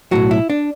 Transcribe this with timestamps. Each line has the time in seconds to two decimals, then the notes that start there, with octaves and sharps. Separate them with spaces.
0.11 B1 A2 F#3 F#4
0.31 E4
0.50 D4